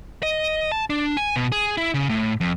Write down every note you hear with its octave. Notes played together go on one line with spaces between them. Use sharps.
D#5
A5
D4
G#5
B2
G#4
E4
C#3
A2
F2